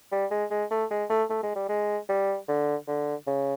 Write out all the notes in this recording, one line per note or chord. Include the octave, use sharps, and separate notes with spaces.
G3
G#3
G#3
A3
G#3
A3
A3
G#3
G3
G#3
G3
D3
D3
C#3